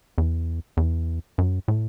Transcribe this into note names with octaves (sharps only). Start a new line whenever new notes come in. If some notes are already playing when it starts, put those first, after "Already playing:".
E2
E2
F#2
A2